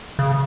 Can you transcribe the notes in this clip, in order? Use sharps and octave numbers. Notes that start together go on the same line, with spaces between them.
C#3